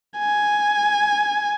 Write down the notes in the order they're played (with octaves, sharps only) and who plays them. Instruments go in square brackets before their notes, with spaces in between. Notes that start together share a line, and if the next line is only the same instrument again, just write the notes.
[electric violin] G#5